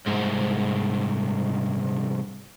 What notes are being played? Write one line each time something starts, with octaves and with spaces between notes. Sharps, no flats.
C2 G#2